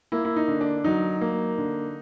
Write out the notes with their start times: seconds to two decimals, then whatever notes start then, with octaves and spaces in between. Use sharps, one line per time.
0.12 A#3 E4
0.25 E4
0.36 D#4
0.48 D3
0.61 D4
0.84 F#3 D#4
1.21 A#3
1.58 D3